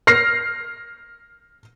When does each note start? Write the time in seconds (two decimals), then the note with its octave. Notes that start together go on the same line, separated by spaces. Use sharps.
0.07 F6 A#6 C7